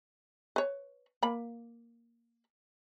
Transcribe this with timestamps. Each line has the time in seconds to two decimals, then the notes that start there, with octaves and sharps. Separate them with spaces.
0.56 B4 C#5
1.23 A#3 B5